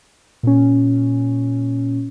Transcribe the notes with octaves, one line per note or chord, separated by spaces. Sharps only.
A#2 C#4